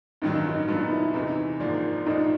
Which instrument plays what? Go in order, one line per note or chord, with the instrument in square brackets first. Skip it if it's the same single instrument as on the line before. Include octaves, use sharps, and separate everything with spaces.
[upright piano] A1 G2 D#3 F#3 [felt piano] D#4
[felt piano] D#4
[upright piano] A#2 F#3 B3 [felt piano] D4
[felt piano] D#4
E4
E4
[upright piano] E2 C3 E3 [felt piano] D#4
[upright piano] G#1 G#2 F3 A#3 D4
[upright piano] A#1 G#2 F3 A3 D4 [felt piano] D#4